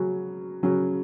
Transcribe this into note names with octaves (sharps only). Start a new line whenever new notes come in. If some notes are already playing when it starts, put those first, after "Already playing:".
Already playing: C#3 F#3 C#4 F#4
C#3 F#3 C#4 F#4